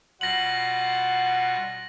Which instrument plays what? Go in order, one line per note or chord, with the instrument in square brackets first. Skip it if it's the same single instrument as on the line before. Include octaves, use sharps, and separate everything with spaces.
[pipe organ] B2 G3 F4 [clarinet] F#5 [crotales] A#6 F#7